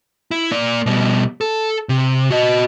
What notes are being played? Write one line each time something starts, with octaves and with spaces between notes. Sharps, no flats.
E4
A#3 D5
B2 G3
A4
C3
F#4 D#5